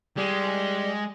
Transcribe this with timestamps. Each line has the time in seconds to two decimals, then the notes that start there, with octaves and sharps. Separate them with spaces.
0.17 G3 G#3